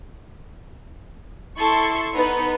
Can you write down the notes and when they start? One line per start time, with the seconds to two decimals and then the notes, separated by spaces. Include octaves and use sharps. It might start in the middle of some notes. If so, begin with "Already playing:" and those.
1.58 E4 A4 C6 C#6
2.14 B3 D#4 B4